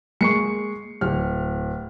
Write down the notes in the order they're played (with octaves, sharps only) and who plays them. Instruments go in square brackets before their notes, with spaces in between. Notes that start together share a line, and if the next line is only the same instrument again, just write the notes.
[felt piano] G#3 A#3 [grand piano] C#6 C7 C#7
[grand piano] D1 [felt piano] F6